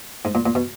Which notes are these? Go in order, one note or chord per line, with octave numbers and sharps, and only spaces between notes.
G#2
A#2
A#2
B2